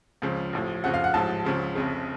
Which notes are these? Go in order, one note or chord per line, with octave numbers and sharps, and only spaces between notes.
C#2 C#3 F3
A1 A2 F3
D2 C#3 F3 F#5
F5
F#5
A1 G#2 F3 A5
C#2 C#3 F3
F1 F2 C#3